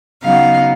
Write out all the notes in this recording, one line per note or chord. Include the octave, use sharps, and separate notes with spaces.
C#3 F#3 B3 D#4 F5